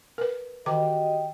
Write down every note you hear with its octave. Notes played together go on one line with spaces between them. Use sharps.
A#4 B4
D#3 E3 F#4 G4 D#5 G5 D6